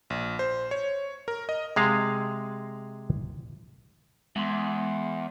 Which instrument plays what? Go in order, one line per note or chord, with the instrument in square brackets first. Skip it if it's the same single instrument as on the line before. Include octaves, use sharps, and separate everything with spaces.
[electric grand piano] A#1
C5
C#5
A#4
D#5
[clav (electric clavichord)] C3 G#3 F5
[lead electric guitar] E2 [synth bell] G#3 C6